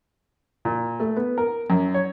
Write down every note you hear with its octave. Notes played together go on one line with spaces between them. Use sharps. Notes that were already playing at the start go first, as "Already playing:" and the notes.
A#2
A3
B3
A#4
F#2
C#5